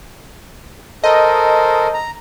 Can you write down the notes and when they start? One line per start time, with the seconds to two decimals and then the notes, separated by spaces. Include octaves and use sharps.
1.04 A4 A#4 C5 D#5
1.94 A#5